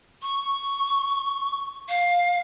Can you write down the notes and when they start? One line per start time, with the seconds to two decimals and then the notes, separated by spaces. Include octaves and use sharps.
0.22 C#6
1.89 F5